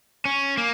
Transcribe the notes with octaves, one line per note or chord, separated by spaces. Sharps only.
C#4
A#3